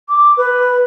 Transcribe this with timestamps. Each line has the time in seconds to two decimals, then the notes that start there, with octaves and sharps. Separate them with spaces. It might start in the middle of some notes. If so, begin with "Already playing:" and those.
0.09 D6
0.37 B4